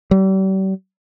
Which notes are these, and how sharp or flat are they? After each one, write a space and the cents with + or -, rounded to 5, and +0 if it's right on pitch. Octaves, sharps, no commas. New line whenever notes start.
G3 -40